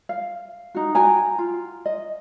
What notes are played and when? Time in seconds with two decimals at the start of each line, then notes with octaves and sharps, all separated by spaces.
0.09 F5
0.75 D#4 F#4
0.95 F#4 G5 G#5 A#5
1.38 F4
1.86 D#5